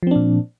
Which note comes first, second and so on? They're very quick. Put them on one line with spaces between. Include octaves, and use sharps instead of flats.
F3 C4 D4 A#2